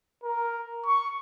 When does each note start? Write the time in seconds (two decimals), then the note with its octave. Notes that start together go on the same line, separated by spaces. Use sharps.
0.24 A#4
0.86 C#6